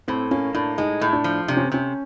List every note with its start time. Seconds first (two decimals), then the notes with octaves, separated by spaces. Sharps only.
0.08 A2 C4
0.31 A#3 C#4
0.55 A2 D4
0.78 G#3 D#4
1.01 A2
1.13 D4
1.24 F3
1.48 C3 D4
1.57 C#4
1.65 C4
1.72 C3 C#4